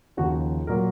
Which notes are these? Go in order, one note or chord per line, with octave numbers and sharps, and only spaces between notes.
D#2 C#3 F3 F#4
A#2 F#3 A#4